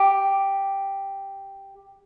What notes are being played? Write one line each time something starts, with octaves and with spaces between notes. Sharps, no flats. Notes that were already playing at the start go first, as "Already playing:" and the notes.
Already playing: G4